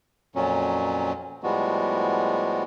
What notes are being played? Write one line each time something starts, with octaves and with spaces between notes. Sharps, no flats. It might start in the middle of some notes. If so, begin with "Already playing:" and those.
F2 A#2 F#3 C#4
A2 F3 G3 G#3 B3 F#4